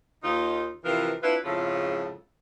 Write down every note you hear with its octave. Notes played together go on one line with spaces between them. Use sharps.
D#2 D#4 F4
C3 E3 F3 F4 A#4 B4
C4 D4 E4 F4 B4
F2 G#2 C#3 E4 F4 A4